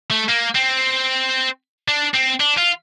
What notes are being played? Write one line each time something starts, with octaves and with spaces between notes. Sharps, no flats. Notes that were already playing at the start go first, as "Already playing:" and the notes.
A3
A#3
C4
D4
C4
D4
F4